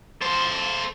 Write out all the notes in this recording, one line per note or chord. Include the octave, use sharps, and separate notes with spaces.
A4 C5